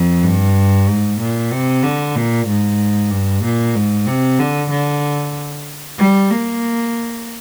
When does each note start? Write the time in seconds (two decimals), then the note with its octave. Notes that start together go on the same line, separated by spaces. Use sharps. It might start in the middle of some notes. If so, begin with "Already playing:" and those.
Already playing: F2
0.24 G2
0.88 G#2
1.20 A#2
1.52 C3
1.83 D3
2.16 A#2
2.47 G#2
3.11 G2
3.44 A#2
3.75 G#2
4.07 C3
4.40 D3
4.70 D3
5.98 G3
6.31 A#3